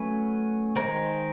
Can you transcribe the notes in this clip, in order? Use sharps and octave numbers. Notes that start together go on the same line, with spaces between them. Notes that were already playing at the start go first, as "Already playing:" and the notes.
Already playing: F#3 A3 C#4 B4
D#3 G#3 C4 A#4